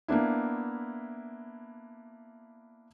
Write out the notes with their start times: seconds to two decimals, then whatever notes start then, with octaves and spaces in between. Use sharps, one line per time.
0.08 A#3 B3 D4 E4